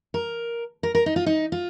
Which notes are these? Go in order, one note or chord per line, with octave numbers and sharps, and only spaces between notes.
A#4
A#4
A#4
D#4
F4
D#4
F4